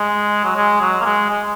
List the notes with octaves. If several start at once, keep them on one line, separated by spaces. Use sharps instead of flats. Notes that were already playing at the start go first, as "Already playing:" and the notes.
Already playing: G#3
F#3
G#3
F#3
A#3
G#3
G#3